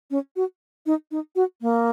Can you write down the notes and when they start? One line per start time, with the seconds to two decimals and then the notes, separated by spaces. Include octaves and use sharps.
0.11 C#4
0.36 F#4
0.86 D#4
1.11 D#4
1.36 F#4
1.62 A#3